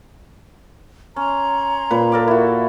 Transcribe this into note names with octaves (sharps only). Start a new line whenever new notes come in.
C#4 C#5 A#5 C6
A#2 B4
A4 A#4 D6
E4 F#4